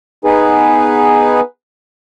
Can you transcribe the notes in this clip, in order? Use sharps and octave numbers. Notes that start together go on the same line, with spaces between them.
B3 D#4 G#4 B4